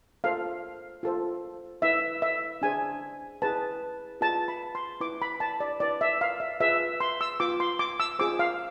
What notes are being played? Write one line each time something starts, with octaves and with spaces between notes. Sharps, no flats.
F4 A4 C5 F5
F4 A4 C5
E4 B4 E5
E5
D4 G#4 C5 G#5
E4 G#4 B4 A5
F4 G#4 B4 A5
B5
C6
E4 B4 D6
B5
A5
D5
E4 B4 D5
E5
F5
E5
F4 G#4 B4 E5
C6
E6
F4 B4 D6
C6
D6
E6
F4 G#4 C5 D6
F5